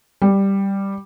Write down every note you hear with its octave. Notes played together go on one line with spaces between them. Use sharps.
G3